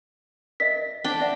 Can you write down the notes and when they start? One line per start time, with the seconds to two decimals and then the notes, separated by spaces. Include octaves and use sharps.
0.60 A#4 D#5 E5 B6
1.04 D4 G5
1.20 D5 E5 F#5